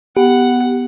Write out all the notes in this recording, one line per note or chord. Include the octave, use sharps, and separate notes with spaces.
B3 G4 F#5